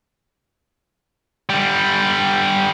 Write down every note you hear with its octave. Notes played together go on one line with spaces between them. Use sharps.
D3 G3